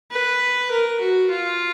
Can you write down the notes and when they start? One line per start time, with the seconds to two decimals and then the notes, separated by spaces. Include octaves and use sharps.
0.11 B4
0.71 A#4
1.00 F#4
1.30 F4